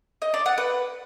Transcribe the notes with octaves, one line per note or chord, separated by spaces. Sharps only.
D#5
D5
F#5
B4